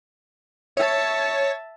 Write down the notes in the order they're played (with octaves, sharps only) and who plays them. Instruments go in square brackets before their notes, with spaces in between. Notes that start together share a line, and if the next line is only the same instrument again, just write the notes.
[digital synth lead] C#5 [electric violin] E5 A5